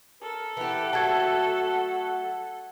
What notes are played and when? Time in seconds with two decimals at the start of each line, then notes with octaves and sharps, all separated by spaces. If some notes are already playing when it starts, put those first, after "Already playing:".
0.22 A4 A#4
0.57 E3 G4 F#5
0.93 F#3 A3 F#4 A5 G#6